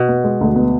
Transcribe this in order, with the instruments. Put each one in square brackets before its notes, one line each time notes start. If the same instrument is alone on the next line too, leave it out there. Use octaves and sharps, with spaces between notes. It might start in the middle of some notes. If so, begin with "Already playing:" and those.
Already playing: [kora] B2
[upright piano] B3
G#3
D2
B3